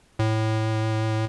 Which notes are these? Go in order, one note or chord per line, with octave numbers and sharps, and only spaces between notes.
A2